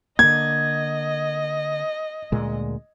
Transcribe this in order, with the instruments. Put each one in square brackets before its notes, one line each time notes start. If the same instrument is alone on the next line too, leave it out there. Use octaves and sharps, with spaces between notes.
[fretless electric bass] D3 A#3 [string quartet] D#5 [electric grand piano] G#6
[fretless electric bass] D2 A#2 G#3